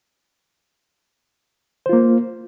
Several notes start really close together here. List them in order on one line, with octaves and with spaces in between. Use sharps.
C5 F4 A#3